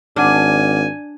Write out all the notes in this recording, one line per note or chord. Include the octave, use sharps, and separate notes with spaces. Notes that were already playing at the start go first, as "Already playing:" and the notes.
G#1 D4 F#5 G#5 D6 F6